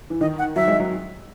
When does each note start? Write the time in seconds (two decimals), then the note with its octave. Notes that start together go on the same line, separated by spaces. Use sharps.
0.10 E3
0.21 D#3 D#5
0.38 F#5
0.56 F#3 E5
0.68 G#3
0.80 F#3